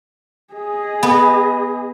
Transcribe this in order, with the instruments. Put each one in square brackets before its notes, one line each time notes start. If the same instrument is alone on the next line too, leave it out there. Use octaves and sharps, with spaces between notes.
[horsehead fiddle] G#4 D#5
[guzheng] B3